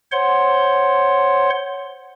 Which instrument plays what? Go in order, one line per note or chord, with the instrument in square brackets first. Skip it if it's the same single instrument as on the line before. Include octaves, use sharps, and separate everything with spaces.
[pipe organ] C5 C#5 F#5 C6